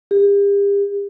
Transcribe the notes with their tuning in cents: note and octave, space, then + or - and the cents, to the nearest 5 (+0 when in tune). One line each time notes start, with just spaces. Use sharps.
G4 +40